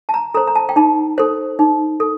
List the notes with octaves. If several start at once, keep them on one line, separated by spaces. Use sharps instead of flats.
A5
A#5
A4 C5 A#5
A#5
A5
G5
D#4 A5
A4 C5
D#4
A4